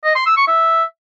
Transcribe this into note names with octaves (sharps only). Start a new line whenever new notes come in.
D#5
C6
E6
C#6
E5